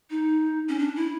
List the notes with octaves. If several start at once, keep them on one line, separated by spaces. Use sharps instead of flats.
D#4
C#4
D4
E4